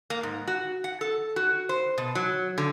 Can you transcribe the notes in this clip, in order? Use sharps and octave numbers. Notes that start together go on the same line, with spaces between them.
A#3
G#2
F#4
F#5
A4
F#4
C5
B2
F#3
D3